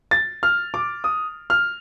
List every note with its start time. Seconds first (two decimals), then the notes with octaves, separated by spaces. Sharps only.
0.11 A6
0.43 F6
0.74 D6
1.04 D#6
1.50 F6